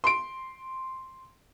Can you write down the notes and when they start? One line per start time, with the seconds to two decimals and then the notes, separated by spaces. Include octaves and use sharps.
0.04 C6 D7